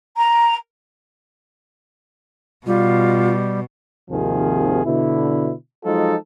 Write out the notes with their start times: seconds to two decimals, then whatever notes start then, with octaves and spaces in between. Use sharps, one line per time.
0.17 A#5
2.67 B2 G3 F4
4.11 G#1 D#2 C3 D#3 F3 G#4
4.85 B2 D3 E4
5.85 F3 F#3 G#3 D#4 F4 A4